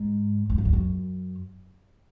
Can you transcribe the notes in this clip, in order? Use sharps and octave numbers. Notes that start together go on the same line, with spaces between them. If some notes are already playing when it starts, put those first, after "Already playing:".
Already playing: G#2
G#2
F#2
E2
F#2